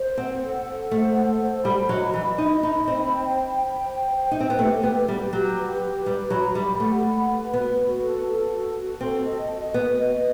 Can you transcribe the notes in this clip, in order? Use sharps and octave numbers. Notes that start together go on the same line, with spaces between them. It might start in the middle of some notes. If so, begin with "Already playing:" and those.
Already playing: C5
C4 F#5
A4
F#5
A3 C5
A4
C5
G3 B5
F#3 D#5
E3 B5
D#4 D#5
D#4 B5
C4 C5
G5
G5
G5
C5
C5
D#4 G5
C4
B3
A3 G4
B3 G4
G3 G4
F#3 G4
B4
G4
G3 B4
F#3 B5
G3 G4
A3 F#5
B5
B4
B3 F#4
F#4
A4
A4
F#4
F#4
C4 A4
D#5
F#4
B3 F#4
D#5